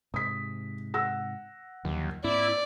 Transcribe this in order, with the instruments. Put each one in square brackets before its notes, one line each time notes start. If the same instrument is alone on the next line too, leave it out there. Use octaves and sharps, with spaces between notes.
[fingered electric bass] G#2 C3 [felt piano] D#6 B6
[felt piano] F#5 E6 A#6
[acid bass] D#2 [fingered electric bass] D3 F3 F#3
[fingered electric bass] G#2 A#3 C4 [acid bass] E4 [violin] D5